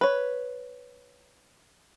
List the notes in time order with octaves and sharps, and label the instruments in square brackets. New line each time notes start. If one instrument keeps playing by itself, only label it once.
[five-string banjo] B4 C#5